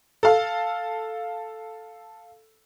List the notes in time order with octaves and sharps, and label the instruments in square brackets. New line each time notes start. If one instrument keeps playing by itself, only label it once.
[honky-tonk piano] A4 F5